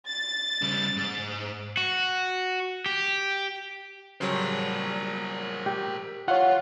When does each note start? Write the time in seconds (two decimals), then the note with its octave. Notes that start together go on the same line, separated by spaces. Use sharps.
0.11 A6
0.62 C#3 G3
0.96 G#2
1.77 F#4
2.86 G4
4.21 C#3 F#3 G3 A#4 C5
5.66 G4
6.28 F4 C#5 F5 F#5